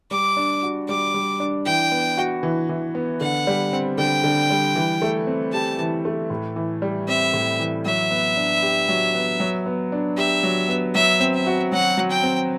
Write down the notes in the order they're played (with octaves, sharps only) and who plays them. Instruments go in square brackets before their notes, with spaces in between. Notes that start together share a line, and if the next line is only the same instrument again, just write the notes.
[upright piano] G3 [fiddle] D6
[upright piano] D4
F#4
[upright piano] G3 [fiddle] D6
[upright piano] G3
D4
[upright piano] E3 [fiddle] G5
[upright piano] B3
F#4
E3
E3
B3
[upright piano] D3 [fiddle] F#5
[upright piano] G3
C4
[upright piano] D3 [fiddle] G5
[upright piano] D3
G3
E3
A3
C4
[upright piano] G4 [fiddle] A5
[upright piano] E3
A3
A2
E3
G3
[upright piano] C4 [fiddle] E5
[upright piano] A2
E3
[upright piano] F#3 [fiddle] E5
[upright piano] B3
D4
G4
F#3
B3
F#3
B3
D4
[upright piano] G4 [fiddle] E5
[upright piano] F#3
B3
[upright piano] F#3 [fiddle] E5
[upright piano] C4
[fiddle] E5
[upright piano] F#4
[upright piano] F#3 [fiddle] F#5
[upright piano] F#3
[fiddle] G5
[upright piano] C4